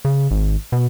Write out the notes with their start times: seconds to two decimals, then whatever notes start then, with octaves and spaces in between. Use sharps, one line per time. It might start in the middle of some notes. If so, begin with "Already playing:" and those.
0.05 C#3
0.31 G#1
0.72 B2